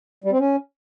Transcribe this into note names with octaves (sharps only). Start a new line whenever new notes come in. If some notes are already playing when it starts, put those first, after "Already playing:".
G3
C4
C#4